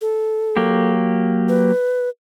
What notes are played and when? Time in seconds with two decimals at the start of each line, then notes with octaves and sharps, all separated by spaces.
0.01 A4
0.57 F#3 A#3 G4
1.49 B4